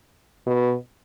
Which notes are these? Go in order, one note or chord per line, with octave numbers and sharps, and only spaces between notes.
B2